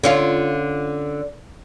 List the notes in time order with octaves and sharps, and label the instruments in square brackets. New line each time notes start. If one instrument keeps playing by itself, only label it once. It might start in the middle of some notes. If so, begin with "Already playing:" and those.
[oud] D3 C#4 F4